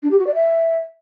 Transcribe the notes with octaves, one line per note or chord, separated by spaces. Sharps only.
D4
G4
F#4
D5
E5